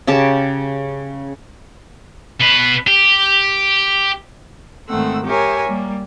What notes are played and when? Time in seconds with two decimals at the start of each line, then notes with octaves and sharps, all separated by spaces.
0.07 C#3 G4 A5
2.41 B2 B4
2.88 G4
4.89 G#2 D#3 A3 C4 F#5 E6
5.27 G4 A#4 C#5 E5 G#5
5.67 G3 A#3